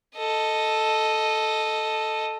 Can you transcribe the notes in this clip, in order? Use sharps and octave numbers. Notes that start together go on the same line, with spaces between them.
A4 D#5